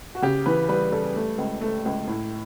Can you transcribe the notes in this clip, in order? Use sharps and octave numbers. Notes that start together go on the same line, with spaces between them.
F#4
C#3 G4
E3 B4
G3 B4
G3 A4
A3
C#2
A3
C#2
A2